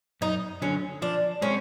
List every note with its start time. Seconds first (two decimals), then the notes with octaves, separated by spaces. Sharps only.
0.21 F#2 D#4
0.62 D3 F#3 C#4
1.02 F3 D4
1.42 G#3 C4 C#4